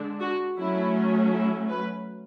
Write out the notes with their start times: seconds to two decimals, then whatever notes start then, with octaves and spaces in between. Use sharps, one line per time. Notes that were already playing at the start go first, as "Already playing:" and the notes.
Already playing: D3 G#3 D4
0.20 F#4
0.56 F#3 A3 C#4 E4
1.32 E4
1.68 B4